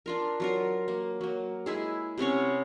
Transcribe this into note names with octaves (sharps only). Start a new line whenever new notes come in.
D4 F4 A#4
F#3 F4 A#4
A#3
F#3 A#3
G#3 E4 G#4
C3 B3 C#4 C#5